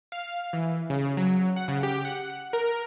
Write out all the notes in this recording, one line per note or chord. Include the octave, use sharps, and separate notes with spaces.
F5
E3
C#3
F#3
F#5
C#3
G4
F#5
A#4